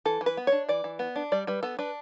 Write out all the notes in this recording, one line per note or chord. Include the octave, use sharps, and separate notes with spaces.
E3 A4
E3
B4
B3
D4 C#5
E3 D5
E3
B3
D4
G3 D5
G3 B4
B3 A4
D4 B4